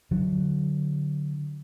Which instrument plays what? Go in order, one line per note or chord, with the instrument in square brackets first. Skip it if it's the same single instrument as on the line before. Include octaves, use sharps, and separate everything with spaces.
[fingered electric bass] D3 F#3